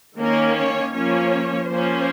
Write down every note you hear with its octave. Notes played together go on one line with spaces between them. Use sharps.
D#3 A#3 C#4 A#4
C#5
F3 A#3 C#4 C#5
F3 A#3 C#4 C5